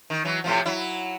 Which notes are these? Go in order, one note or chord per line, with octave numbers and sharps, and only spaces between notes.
D#3
E3 F#3
A2 C3 F3
F#3 E4